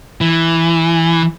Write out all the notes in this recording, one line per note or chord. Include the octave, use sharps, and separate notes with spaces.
E3